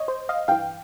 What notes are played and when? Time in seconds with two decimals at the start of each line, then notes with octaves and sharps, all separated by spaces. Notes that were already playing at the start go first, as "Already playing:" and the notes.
Already playing: C#5 D#5
0.08 C5
0.29 D#5 F5
0.48 G2 E3 F5 G5